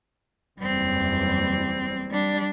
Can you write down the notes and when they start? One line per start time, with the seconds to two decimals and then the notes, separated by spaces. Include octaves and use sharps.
0.59 F#1 E2 G3 C4
2.11 G3 D4